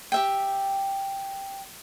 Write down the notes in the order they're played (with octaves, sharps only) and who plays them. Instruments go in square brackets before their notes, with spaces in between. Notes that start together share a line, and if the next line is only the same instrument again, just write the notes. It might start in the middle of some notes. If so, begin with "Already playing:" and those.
[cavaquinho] G4 E5 G5